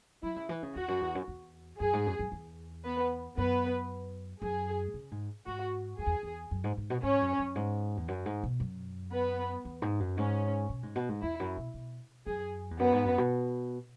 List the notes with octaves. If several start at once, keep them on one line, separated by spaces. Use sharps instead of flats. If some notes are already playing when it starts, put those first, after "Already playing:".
F#3 E4
C#3
E3
C#3
E2 F#4
F#2
E2
F#2
E2
F#2 G#4
G#2
F#2
F#2
E2
B3 B4
F#2 B3 B4
F#2 G#4
C#3
G#2
G#2 F#4
F#2 G#4
E2
E2
F#2
G#2
G#2
B2
G#2 C#4 C#5
F#2
F#2
G#2
E2
F#2
G#2
B2
F#2
B3 B4
E2
G#2
F#2
G#2 C#4
B2
G#2
B2
G#2
E2 E4
F#2
B2
B2
F#2 G#4
E2
F#2 B3 B4
G#2
F#2
B2